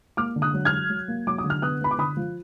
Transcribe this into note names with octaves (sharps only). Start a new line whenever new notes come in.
A#3 D6 F6
D3
D#6 F#6
F#3
F6 G#6
F#3
F#3
A#3
F#3 D6
D#6
D3
F6
B3 D#6 F#6
B3 B5
D6
D3 B5 D#6
F3